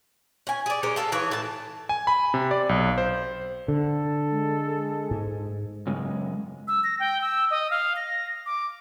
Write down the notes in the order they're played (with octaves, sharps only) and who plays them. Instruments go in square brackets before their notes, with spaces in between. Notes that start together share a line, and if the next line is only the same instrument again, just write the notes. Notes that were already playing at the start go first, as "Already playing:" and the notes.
[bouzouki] C#4 G#5
G#4 D5
G#3 C#4 A#4 C5
F4 A4 D5 F5
E3 G#4 C#5
A2 A5
[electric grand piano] G#5
B5
C3
D5
B1
C5
[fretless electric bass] D3 [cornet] A4
[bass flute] G#3
[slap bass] G#2
[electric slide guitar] F#2 C#3 G#3
[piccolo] E6
A#6
G5
E6
D#5
F5
A#6
D6